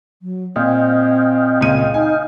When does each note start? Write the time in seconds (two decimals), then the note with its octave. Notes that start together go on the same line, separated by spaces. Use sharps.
0.22 F#3
0.56 A#2 C4 D#5 F5 G5
1.61 C#2 A#2 D#7
1.94 D#4 G#5